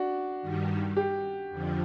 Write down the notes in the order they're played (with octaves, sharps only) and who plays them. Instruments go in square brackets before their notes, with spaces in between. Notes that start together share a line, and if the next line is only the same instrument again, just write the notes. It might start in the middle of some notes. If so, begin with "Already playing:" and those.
Already playing: [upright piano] D4 F#4
[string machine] G2 D#3 G3
[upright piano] G4
[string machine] F2 D3 F3